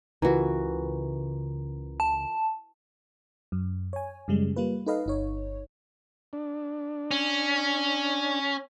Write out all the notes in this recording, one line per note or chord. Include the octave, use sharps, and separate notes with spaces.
C#2 C#3 E3 F4 F#4 A#4 A#5
A5
F#2
C#5 G#5
F#2 C#3 G3 G#3
G3 A#3 F4 B4
D#4 A4 B4 D#5 F5
G1 D#4 C#5
D4
C#4